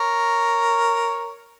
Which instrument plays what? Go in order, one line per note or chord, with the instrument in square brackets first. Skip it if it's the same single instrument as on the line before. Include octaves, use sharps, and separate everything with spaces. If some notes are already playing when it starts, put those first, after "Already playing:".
Already playing: [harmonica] A#4 C#5